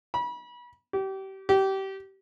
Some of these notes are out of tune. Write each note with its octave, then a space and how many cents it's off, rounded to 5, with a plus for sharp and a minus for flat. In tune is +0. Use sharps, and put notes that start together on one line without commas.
B5 -30
G4 -30
G4 -25